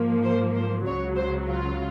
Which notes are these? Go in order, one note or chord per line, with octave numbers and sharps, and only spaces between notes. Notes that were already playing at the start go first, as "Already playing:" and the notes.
Already playing: G#2 F3 A#3
C5
C5
C#2 C#3 F#3 C#5
C5
F4